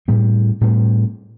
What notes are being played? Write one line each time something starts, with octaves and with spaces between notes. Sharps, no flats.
A2 G3 C4
A2 G3 C4